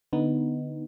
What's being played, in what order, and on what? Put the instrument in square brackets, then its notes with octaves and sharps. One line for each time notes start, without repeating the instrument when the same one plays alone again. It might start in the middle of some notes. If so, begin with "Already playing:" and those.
[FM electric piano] D3 B3 D#4